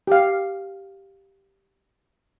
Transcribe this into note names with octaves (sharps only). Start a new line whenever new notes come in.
G4 F5